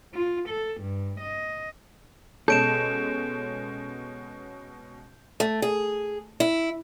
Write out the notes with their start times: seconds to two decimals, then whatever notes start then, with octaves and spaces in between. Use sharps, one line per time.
0.13 F4
0.47 A4
0.80 G2
1.19 D#5
2.48 B2 G#3 C#4 A4 G6 D7 E7
5.40 A3
5.62 G#4
6.40 E4